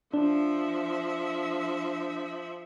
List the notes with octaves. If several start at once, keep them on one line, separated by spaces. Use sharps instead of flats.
F3 D4 E5